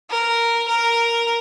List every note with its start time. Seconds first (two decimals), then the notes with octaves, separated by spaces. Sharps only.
0.10 A#4
0.68 A#4